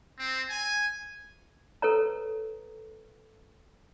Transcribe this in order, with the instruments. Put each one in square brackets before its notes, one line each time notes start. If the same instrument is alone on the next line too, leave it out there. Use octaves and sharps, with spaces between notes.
[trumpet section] C4
G#5
[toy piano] A4 B4 C#5 A#5